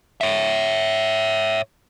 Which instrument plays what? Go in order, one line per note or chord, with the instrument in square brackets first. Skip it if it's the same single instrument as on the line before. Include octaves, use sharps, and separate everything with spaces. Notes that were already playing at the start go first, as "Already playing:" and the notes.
[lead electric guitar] C#5 E5